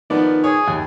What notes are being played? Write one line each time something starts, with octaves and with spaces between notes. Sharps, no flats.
D#3 F3 B3 D5
G#4 C#5
D#2